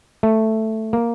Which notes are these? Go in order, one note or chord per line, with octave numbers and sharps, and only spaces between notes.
A3
A#3